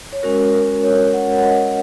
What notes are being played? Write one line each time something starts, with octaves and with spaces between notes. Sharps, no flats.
C#5
G#3 C#4 F#4 A#4
A#4
C#5
F#5
F#5
D#5